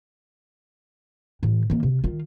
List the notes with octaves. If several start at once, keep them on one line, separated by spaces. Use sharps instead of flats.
A2 E3
E3 A#3
C3
D#3 F4